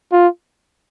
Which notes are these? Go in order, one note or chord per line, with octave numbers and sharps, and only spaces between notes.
F4